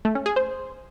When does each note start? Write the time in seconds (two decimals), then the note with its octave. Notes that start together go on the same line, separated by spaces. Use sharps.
0.05 A3
0.15 C#4
0.26 G#4
0.36 C5